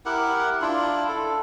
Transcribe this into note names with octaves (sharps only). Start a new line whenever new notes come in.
E4 G4 A#4 F#5
D4 E4 F4
A4